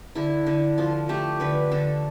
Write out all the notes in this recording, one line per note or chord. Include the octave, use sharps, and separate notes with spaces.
D3 E4
D3
F3 F4
A3 G4
D3 B4
D3 A4